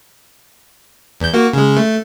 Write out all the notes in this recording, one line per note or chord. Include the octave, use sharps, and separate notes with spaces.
E2 G6
A#3 F#4
C#3 G#3
A3